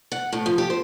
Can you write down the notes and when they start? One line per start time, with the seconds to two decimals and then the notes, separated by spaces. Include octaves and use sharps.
0.12 F#5
0.33 A2
0.46 F3
0.58 G4
0.70 C5